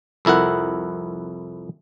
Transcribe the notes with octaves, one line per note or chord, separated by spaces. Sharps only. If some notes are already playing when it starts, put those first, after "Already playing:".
C2 F2 E4 A#4 F#5